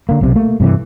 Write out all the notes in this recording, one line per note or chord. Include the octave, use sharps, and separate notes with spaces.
D3 A#3
B1 C3
A3 A#3
G2 C3 E3